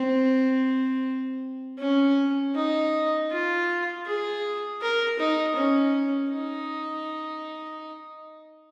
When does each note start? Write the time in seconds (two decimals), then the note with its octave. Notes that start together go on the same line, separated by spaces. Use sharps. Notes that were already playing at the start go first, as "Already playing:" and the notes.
Already playing: C4
1.79 C#4
2.55 D#4
3.30 F4
4.06 G#4
4.81 A#4
5.19 D#4
5.56 C#4
6.32 D#4